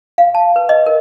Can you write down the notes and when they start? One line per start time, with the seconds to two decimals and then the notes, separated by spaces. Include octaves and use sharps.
0.18 F5
0.35 A5
0.56 B4
0.69 D#5
0.86 A#4